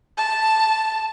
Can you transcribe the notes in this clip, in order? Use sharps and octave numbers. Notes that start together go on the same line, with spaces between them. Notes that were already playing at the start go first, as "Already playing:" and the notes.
A5